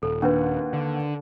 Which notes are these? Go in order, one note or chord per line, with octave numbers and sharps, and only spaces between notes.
D#1 A4
D#2 D4 B4 F#5
D3